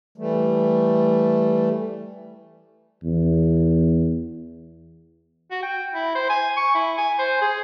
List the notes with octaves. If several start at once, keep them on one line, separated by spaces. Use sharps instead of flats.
E3 G3 A3
E2
F#4
G5
E4
C5
G#5
C#6
E4
G#5
C5
G#4